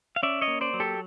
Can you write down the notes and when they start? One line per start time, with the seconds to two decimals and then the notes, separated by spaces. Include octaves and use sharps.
0.16 F5
0.23 C#4 D5 E5
0.41 C#5 D#5
0.48 A#3
0.61 C5 D5
0.74 F#3
0.80 G4 A4